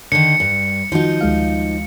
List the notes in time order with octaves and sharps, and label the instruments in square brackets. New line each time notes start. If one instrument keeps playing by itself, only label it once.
[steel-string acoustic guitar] D3 D#3 [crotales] C#7
[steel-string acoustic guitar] G2
[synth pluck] D#3 F#4 [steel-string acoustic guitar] F3 D#4
[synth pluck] D2 G#3 F5